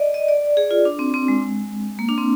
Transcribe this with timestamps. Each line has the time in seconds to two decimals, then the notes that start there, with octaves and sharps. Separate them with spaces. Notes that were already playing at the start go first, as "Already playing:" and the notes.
Already playing: D5 D#5
0.14 D#5
0.28 D5
0.57 G#4
0.71 F4
0.85 D4
0.99 C4
1.14 C4
1.28 G#3
1.99 A#3
2.09 D4
2.18 C4